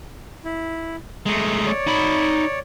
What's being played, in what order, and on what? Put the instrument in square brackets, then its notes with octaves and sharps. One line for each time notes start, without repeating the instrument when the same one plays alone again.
[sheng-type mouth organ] E4
[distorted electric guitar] G#3 A3 [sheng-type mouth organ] A#5
[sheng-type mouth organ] C#5 D5
[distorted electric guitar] D#4 B5